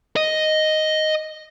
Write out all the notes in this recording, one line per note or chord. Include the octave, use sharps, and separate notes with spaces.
D#5